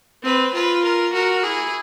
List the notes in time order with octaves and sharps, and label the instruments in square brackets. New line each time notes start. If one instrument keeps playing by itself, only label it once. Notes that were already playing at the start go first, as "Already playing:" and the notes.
[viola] C4 [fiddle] B4
[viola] F4 [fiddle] B4
[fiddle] A#4
[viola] F#4 [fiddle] A#4
[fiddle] E4 [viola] G#4